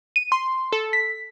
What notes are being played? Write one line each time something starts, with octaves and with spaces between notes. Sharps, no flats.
D#7
C6
A4
B6